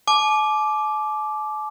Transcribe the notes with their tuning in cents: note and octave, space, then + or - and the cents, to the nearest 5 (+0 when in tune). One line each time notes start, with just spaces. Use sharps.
A5 -45 D6 +0